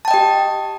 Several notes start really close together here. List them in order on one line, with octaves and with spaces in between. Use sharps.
A5 G5 D#5 G4